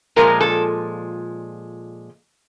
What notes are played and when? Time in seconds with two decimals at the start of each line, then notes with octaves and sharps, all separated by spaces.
0.16 A#2 F3 G#3 A#4
0.41 A4